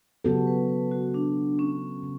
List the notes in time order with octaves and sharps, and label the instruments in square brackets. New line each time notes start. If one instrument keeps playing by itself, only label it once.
[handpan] C#3 F#3 B3 F#4 A4 [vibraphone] G4
[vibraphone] B4
B4
F#4
D4
C#4
[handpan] C#3